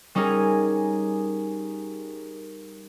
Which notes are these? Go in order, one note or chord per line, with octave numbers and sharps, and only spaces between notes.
G3 C#4 D#4 G#4 A#4